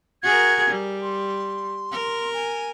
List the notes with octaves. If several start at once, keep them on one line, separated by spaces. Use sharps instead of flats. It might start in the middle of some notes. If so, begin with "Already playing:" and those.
F#4 G#4 A#4 G#6
G3
C6
A#4
G#5